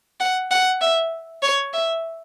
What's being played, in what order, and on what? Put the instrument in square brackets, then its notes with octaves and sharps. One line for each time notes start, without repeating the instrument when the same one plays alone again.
[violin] F#5
F#5
E5
C#5
E5